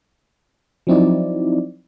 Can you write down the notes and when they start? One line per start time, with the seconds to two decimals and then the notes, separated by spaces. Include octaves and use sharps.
0.87 F3 F#3 C4 D#4 E4 D5